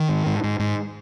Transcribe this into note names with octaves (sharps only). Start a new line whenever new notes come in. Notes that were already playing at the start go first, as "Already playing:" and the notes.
Already playing: D#3
G#2
G#2
G#2
G#2